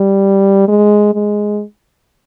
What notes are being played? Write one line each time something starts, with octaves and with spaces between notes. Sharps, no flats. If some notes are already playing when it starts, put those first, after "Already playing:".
Already playing: G3
G#3
G#3